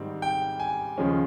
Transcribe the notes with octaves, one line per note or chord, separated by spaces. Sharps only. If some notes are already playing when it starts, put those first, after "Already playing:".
Already playing: G#2 D#3 G3 C4
G5
G#5
D#2 C#3 F3 G#3 C#4